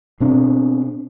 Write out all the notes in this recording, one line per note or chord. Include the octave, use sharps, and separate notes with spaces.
B2 C4 D4